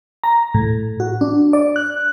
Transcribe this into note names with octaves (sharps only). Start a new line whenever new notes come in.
A#5
A2
F#4
D4
D5
F#6